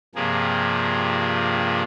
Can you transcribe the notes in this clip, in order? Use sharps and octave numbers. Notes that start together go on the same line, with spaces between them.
G2 C3 F3 A#3 G#4